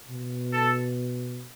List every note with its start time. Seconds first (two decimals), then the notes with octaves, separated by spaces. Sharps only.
0.08 B2
0.53 A4